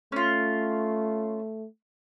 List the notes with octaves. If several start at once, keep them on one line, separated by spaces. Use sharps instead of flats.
A3 C#4 F4